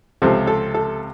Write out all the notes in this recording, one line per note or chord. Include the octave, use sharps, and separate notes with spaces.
C#2 C3 F3 A4
A4
A4